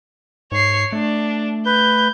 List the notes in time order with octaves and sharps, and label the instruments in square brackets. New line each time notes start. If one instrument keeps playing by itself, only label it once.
[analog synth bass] G#2 [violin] C#5 C7
[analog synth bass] A3 [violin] D4
[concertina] B4 [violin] G6